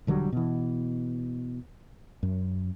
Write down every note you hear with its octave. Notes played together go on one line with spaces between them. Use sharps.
E1 D3 F#3 G3
B2 E3
F#2